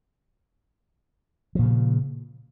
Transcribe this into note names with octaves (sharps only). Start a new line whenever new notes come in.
A#2 C#3 F3